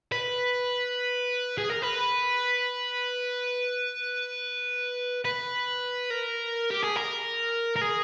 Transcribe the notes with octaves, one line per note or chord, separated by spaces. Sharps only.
B4
G#4
A#4
B4
B4
A#4
G4
G#4
A#4
A#4
G#4